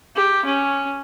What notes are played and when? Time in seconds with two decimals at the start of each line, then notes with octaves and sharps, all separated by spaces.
0.15 G4
0.45 C#4